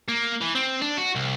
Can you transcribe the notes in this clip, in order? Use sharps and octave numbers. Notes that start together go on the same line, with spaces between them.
A#3
E3
C4
D4
F#4
C2